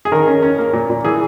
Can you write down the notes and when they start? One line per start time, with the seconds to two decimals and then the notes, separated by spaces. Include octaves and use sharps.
0.05 G#4
0.12 D#3 A#4
0.27 C#4
0.43 C#4
0.59 A#3
0.73 A#2
0.90 A#2
1.05 E3 G#4